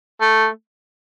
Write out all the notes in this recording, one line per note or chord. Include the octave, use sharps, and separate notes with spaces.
A3